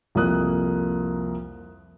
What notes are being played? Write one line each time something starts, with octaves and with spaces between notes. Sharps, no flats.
C2 F2 A#3 D#6 F#6